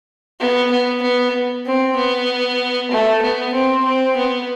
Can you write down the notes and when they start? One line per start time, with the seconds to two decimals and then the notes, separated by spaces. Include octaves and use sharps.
0.39 B3
0.71 B3
1.02 B3
1.65 C4
1.96 B3
2.91 A3
3.22 B3
3.53 C4
3.84 C4
4.16 B3